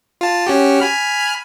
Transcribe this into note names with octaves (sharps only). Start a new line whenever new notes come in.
F4 A5
C#4 F#4 G4
G#5 B5 F6